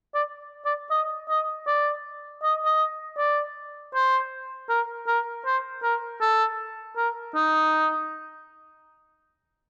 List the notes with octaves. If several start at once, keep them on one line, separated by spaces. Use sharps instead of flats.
D5
D5
D#5
D#5
D5
D#5
D#5
D5
C5
A#4
A#4
C5
A#4
A4
A#4
D#4